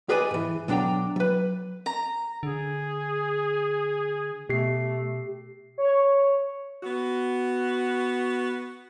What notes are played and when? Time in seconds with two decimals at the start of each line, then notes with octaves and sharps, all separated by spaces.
0.09 G4 G#4 B4 D5 D#5 G#5
0.31 G#2 E3
0.68 B1 F#3 D4 G5 A#5
1.16 F#3 B4
1.86 A#5
2.43 D3 G#4
4.49 B2 A3 G4 C7
5.78 C#5
6.83 B3 F#4